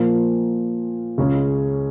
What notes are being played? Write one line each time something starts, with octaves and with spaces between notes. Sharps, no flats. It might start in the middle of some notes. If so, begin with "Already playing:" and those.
Already playing: A#2 F3 A#3
C#2 C#3 G#3 C#4